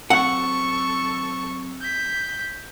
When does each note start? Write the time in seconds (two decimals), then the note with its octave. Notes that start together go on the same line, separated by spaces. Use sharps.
0.10 F#3 C4 A4 F#5 C#6 E6
1.81 G6 B6